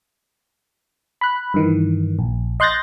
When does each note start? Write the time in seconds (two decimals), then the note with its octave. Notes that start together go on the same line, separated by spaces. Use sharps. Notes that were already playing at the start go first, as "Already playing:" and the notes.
1.21 B5 F#6
1.54 G2 D#3 E3
2.19 A#1
2.60 D#5 C6 F#6 G6 A6 A#6